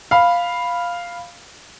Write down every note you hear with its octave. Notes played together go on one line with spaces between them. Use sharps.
F5 B5